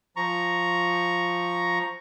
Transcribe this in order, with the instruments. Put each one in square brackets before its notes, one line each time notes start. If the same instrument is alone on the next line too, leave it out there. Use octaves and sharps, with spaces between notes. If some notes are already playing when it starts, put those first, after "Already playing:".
[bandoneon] F3 A#5 C#6